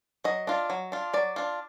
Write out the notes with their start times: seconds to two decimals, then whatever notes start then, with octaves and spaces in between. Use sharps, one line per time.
0.24 F#3 D#5
0.47 D4 F4
0.70 F#3
0.92 D4 F4
1.13 F#3 D5
1.36 D4 F4